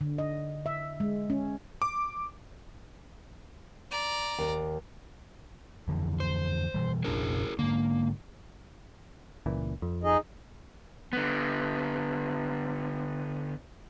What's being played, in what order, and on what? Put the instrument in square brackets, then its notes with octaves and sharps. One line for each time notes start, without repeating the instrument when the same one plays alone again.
[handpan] D3
D#5
E5
G#3
C#4
[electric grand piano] D6
[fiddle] D5 A#5
[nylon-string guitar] D#2
[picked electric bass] F2 D3 E3
[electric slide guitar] C5
[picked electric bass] B2 E3 G3
[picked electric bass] F1 A#1 D4 [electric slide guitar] E4 G#4 A#4
[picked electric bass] G#2 D3 [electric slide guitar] A#3
[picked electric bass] C#2 A#2 E3
F2
[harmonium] D#4 G#4 D#5
[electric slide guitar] D3 B3